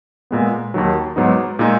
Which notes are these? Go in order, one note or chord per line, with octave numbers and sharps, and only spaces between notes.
A#2 G#3 B3
D#2 D#3 F#3
G#2 F#3 B3 D#4
A#2 G#3 D#4